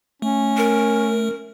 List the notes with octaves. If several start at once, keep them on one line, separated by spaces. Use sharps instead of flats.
A3 C#4
A#4